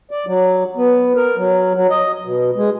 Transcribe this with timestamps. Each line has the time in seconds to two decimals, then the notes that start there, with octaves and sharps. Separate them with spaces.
0.11 D5
0.27 F#3
0.77 B3
1.16 A#4
1.37 F#3
1.75 F#3
1.90 D#5
2.25 B2
2.56 G#3